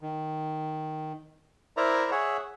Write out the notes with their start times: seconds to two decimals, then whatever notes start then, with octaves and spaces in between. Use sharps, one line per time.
0.01 D#3
1.77 E4 A#4 C5 D5 E5 A#5
2.11 G#4 C#5 E5 F#5